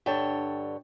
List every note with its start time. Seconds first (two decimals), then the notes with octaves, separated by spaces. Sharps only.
0.06 G2 D3 C#5 G5 A5